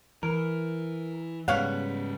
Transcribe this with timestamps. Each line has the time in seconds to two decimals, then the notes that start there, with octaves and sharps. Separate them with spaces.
0.23 E3 A#4
1.48 G#2 C#3 G3 B3 C#5 F5 F#5